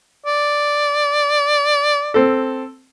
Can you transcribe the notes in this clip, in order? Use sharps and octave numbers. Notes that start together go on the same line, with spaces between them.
D5
C4 A4